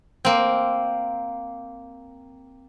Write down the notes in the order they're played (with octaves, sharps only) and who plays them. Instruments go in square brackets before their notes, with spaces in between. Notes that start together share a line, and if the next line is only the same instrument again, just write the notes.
[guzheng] A#3 C4